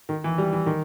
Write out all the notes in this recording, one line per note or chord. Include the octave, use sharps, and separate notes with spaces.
D#3
E3
G3
E3
D#3